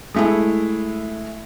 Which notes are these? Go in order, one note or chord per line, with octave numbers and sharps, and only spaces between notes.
G#3 A3 E4